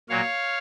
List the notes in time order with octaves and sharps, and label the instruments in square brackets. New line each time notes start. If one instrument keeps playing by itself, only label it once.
[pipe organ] A#2 F#3 A#3 C#5 F5